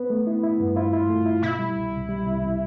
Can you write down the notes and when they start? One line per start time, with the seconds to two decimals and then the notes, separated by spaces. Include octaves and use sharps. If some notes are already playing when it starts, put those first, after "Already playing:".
Already playing: B3
0.10 A3
0.27 E4
0.43 E4
0.60 G2
0.76 E4 F4
0.93 E4
1.09 A3
1.26 E4
1.42 B2 E4
1.59 G3
1.76 C2
1.92 C2
2.09 G3
2.25 C2
2.41 C2